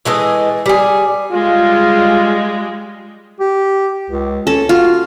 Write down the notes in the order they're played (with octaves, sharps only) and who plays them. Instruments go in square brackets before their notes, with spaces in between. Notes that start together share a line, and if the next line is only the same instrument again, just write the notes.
[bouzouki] E3 G#3 A3 D#5
G3 G#4
[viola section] G3 G#3 [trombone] F4
[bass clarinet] G4
C#2
[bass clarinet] C#4 [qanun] A4
[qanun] F4 [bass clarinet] F#4